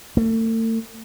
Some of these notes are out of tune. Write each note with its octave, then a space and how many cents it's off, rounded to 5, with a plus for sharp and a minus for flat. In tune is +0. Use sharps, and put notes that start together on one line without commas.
A3 +40